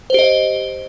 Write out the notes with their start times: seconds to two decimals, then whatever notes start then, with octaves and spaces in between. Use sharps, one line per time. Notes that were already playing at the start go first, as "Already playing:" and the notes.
0.10 C5
0.14 G4
0.19 D#5